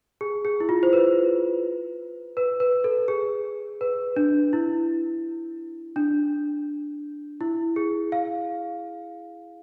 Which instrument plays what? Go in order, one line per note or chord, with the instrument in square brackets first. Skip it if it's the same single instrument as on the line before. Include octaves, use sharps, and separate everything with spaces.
[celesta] G#4
G#4
E4
F4
C5
B4
B4
B4
A4
G#4
B4
D4
E4
D4
E4
G#4
F5